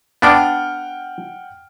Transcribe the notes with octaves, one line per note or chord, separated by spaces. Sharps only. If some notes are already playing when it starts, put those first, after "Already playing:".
B3 D4 D5 F#5 G5 F6